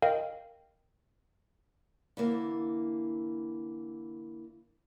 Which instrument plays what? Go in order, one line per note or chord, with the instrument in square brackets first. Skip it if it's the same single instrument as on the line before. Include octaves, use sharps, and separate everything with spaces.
[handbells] A#4 D#5 F5 G5
[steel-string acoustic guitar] D3 E3 A#3